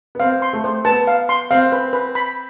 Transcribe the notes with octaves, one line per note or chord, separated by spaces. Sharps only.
B3
C4 F5
C6
A3
C5
B3 A5
F5
C6
C4 F5
B4
B4
B5